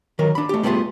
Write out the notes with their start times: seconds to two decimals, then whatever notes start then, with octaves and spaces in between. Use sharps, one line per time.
0.19 D#3 F#3 A#4
0.35 D4 B5
0.49 A3 G4
0.63 G3 A3 B3 D#4 F4 G#4